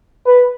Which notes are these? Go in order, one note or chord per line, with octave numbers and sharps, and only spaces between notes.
B4